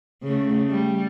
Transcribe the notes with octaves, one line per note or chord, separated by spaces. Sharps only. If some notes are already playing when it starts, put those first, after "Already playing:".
C#3 A3
G3